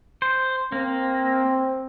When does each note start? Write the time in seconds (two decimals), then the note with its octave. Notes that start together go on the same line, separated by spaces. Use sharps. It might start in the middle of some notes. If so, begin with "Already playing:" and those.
0.22 C5
0.72 A#3 C4